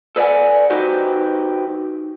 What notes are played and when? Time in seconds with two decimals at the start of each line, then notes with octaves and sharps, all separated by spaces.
0.16 A4 B4 D5 D#5 F#5 G#5
0.70 D#4 F#4 G4 B4 C5